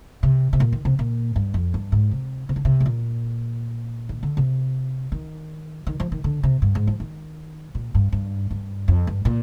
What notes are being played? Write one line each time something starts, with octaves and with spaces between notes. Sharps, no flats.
C3
C3
A#2
D#3
C3
A#2
G2
F2
G2
G#2
C3
C3
D3
C3
G#2
A#2
D#3
D3
C3
D#3
D#3
F3
D#3
D3
C3
G2
G#2
F3
D#3
A#2
G2
G2
G2
F2
G2
A#2